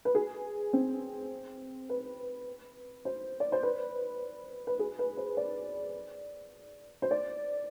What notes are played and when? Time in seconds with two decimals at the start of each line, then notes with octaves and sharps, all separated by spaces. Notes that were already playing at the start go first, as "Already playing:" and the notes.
0.05 B4
0.15 G#4
0.73 C4
1.89 B4
3.05 C5
3.40 D5
3.52 C5
3.63 B4
4.67 B4
4.79 G#4
4.99 B4
5.17 C5
5.37 D5
7.02 C5
7.11 D5